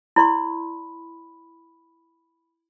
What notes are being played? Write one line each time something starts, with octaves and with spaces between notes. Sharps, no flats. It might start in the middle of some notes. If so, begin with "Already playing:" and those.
E4 D5 B5 C6